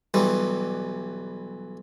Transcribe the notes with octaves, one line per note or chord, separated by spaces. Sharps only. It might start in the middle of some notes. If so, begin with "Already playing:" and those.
B1 E3 G3